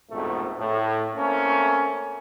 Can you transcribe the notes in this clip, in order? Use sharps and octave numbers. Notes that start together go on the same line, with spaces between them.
A#1 F2 G#2 B2 A3
A2
A3 A#3 C4 C#4